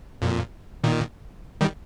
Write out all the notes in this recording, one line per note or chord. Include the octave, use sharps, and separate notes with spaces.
F2 A#2
A#2 D#3
D#3 G3